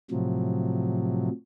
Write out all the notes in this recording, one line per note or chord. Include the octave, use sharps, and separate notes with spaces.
A2 C3 F3 F#3